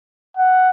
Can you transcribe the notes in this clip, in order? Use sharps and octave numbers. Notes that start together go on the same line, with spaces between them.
F#5